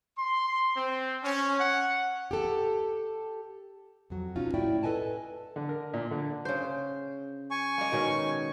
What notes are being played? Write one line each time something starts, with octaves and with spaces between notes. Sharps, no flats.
C6
C4
C#4
F#5
G4 A4
F2 F#3
B2 C#4 D#4 F4 F#4
A2 E4 F#4 D5 E5 G5
A4 B4 D#5 G#5 A5
D3
A#4
A#2
D3
C#3 C5
G#5 C#6
G#3 A#3
B2 D#3 C#4